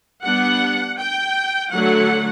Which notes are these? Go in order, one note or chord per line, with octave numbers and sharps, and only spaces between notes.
G3 B3 D4 F#5
G5
D3 F#3 A3 F#5